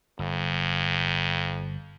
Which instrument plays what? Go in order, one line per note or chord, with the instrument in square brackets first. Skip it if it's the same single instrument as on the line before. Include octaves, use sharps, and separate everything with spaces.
[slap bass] G1 [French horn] F2